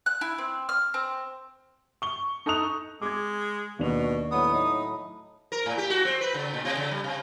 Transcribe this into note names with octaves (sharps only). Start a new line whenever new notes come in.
F#6
E4
C4
F6
C4
C#6 G7
D#4 A4 C#6 D#6 F#6 F7
G#3 D6 G#6
D#2 B2 D4 F7
A2 F#3 B3 B5 D#6
D#4
A#4
A2
G4
F#4
C4
B4
C#3
A#2
C3
C#3
G3
C3